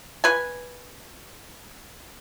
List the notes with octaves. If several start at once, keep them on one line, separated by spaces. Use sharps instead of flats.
B4 G#5